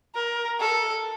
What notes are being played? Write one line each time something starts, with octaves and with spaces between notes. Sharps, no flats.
A#4
A4